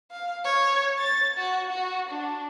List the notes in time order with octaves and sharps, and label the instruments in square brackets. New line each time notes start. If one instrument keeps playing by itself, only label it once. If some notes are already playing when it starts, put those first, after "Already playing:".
[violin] F5
C#5
A6
F#4
F#4
D4